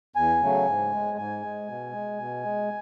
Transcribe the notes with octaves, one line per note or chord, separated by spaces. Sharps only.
E2 G#5
C#3 F#3 A3
G#2
G#3
G#2 G#5
G#3
B2
G#3
B2
G#3